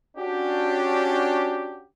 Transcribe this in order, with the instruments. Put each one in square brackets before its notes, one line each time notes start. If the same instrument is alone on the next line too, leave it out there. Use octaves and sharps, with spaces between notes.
[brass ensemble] C#4 D4 F#4 G4